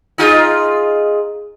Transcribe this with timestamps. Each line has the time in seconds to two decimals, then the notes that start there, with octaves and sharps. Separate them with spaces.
0.18 D#4 F4 G#4